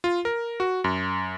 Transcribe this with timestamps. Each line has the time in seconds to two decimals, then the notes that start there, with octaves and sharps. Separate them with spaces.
0.04 F4
0.25 A#4
0.60 F#4
0.84 F#2